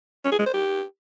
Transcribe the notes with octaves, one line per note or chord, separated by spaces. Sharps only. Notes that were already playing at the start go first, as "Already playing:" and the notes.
C#4
G#4
G#3
C5
G4